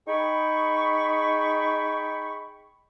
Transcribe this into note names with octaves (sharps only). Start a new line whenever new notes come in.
D#4 G#4 G5 B5 C#6